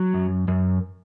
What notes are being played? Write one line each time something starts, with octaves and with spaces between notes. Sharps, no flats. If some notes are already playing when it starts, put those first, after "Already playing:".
Already playing: F#3
F#2
F#2